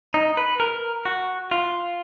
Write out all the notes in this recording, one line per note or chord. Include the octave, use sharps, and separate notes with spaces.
D#4
B4
A#4
F#4
F4